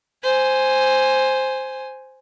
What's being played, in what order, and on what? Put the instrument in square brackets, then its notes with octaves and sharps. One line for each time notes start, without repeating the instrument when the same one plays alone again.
[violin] C5 G#5